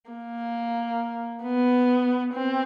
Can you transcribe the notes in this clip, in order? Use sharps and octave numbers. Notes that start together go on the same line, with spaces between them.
A#3
B3
C4